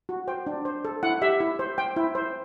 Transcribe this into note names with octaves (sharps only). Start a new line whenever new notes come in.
F#4
C5 G5
D4
C5
A4
E4 F#5
G4 E5
E4
C5
C5 G5
E4
C5